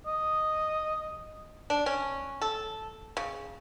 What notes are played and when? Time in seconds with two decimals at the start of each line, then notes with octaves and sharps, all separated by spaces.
0.07 D#5
1.70 D4
1.86 C#4
2.42 A4
3.17 C#3